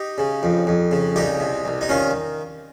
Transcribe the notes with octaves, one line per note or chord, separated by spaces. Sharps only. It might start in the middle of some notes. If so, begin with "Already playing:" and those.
Already playing: D#4 G4
C#3
F2
F2
C#3
C2 D#4 G4
C3
C2
D#4
D#3 C#4 F4